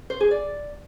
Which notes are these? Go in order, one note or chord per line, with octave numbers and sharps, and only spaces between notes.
C5
G#4
D5